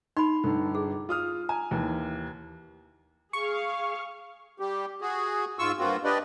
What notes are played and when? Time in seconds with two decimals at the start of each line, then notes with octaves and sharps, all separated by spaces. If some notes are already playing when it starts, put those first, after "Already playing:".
0.17 D#4 B5 C6
0.43 G1 D3 A4
0.75 G#4
1.09 F4 D#6 F6
1.49 G#5 A#5
1.71 D#2 E3
3.33 G#4 F5 C#6
4.60 G3 G4
5.01 F#4 G#4
5.59 G#2 F4 C#6 E6
5.79 G2 A#3 C4 F4 F#4
6.04 D4 G4 B4 D5 D#5